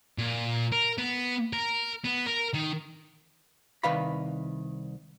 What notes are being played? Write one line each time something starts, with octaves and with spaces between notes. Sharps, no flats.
A#2
A#4
B3
A#4
B3
A#4
D#3
C2 D#3 B4 F5 B5